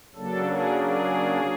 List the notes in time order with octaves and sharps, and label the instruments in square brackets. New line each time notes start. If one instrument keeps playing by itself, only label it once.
[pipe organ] C#3 F#3 A#3 D4 A4
G#4
G#4